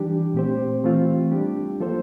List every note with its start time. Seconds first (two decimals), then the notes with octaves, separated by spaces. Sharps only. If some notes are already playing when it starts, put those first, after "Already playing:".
Already playing: E3 G3 D4 G4
0.34 A#2 A3 C4 G4 C5
0.84 E3 A3 C4 F4
1.31 G3 D4 G4
1.80 F3 A#3 F4 A4 C5